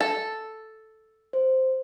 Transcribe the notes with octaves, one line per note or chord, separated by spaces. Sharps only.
A4
C5